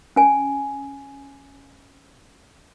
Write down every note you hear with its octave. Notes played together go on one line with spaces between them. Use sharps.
C#4 G#5